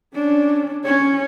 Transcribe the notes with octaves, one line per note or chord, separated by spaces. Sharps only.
C#4 D4
C#4 C#5